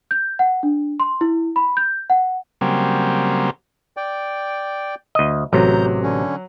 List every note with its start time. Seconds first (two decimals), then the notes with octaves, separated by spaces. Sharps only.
0.11 G6
0.39 F#5
0.63 D4
1.00 C6
1.21 E4
1.56 B5
1.77 G6
2.10 F#5
2.61 C#3 F#3 G3 A#3 C4
3.97 D5 G5
5.15 D2 D#5
5.53 A1 C3 F#3 A#5 G6
6.03 D3 C#4